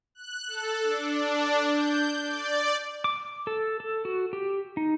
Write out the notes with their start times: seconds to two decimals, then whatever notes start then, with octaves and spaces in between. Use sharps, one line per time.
0.15 F#6
0.47 A4
0.83 D4
1.71 G6
2.22 D5
3.04 D6
3.47 A4
3.80 A4
4.05 F#4
4.33 G4
4.77 D#4